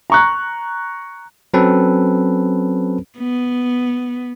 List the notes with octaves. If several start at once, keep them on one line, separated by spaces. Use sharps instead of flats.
A#5 C#6 F#6
F#3 C4 C#4 A4 B4
B3